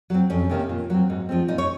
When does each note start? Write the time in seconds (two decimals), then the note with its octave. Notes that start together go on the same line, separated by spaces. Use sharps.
0.10 F#3 C4
0.30 F2 C#4
0.50 C3 D#3 A#3 C#4
0.69 A#2
0.90 F#3 C4
1.10 G#2
1.29 F3 G#3 C4
1.48 A#2 D#4
1.58 C#5